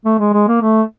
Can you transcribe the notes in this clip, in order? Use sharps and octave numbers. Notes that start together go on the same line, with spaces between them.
A3
G#3
G#3
A#3
A3